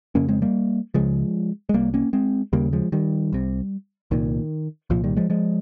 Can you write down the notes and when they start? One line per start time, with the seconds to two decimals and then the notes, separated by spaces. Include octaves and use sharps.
0.15 F2 C#3 A#3 C#4
0.29 G#3 C4
0.42 G3 A#3
0.94 C#2 C#3 F3 G#3
1.69 G#3
1.74 C2 C3 G3 A#3
1.94 A#3 C#4
2.13 G#3 C4
2.53 D#2 C#3 G3 A#3
2.73 F3 G#3
2.92 D#3 G3
3.32 C2 C3
4.11 C2 A#2 D#3
4.90 C2 A#2 F3
5.04 D#3 G3
5.17 F3 G#3
5.30 F3 G#3